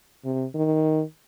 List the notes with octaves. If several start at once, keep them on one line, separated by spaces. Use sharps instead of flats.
C3
D#3